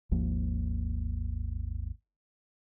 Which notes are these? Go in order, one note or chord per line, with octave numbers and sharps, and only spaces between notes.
G#1 D#2 F3 A#3